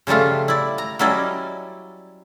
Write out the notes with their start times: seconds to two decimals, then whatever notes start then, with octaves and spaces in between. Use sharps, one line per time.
0.07 C#3 F3 G3 A3 F4
0.48 E4 D5
0.78 A#5
0.99 F#3 G3 C#4 E4 D5 D#5